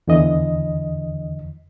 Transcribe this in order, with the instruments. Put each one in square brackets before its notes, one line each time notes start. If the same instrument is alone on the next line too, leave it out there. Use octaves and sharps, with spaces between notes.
[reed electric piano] E2 D3 E3 D#5